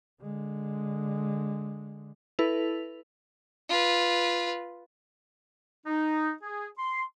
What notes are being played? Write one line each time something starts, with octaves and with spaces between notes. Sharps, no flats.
D3 G#3
E4 A4 B4 F7
F4 B4
D#4
G#4
C6